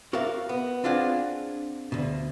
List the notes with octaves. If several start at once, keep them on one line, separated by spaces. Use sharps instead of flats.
F#4 A#4 D5 E5 F5
B3
C4 D4 F4 G#4 F#5
D2 B2